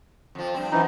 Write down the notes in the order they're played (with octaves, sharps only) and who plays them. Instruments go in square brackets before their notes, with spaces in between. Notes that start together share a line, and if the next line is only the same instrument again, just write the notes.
[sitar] F2 F3
G2 C4
[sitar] F#2 [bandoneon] E3 D#4